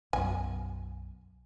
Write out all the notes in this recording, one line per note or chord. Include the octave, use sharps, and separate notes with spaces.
B1 F#2 G#5